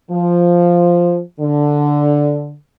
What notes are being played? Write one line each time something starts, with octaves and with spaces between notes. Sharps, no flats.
F3
D3